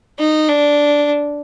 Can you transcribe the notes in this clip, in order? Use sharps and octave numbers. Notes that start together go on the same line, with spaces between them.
D#4
D4